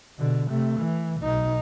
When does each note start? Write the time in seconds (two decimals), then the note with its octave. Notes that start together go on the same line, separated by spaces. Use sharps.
0.19 B2 D3
0.49 C3 A3
0.80 E3
1.22 B1 D#4